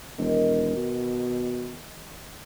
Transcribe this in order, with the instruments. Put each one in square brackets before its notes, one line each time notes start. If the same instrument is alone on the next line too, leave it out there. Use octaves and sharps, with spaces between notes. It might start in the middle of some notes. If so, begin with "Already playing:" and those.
[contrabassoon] E1 [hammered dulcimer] D#3
[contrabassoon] B2